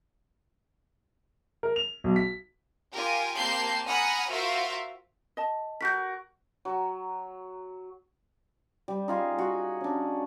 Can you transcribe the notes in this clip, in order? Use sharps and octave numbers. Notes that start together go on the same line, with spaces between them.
A#4
F7
B1
B6
F4 G4 A#4 G#5
A#3 C4 G4 A5 G6 C7
F#5 G#5 A#5 B5 D#6 F6
F4 F#4 A#4 C5 E5 F5
D#5 A5
F#4 A#4 G6 A#6 B6
F#3
G3
D#4 F4 G#4
F#4
C#4 D4